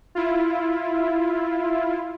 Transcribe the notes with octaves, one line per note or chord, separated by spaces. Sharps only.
E4 F4